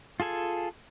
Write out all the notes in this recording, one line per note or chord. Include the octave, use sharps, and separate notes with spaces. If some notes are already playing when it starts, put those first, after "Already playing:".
F4 G#4 A4 G#5